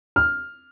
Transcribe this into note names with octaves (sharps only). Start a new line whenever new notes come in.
F6